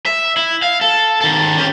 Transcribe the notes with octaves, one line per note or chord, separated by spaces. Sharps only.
E5
E4
F5
A4
D#3 A4
C#4 G4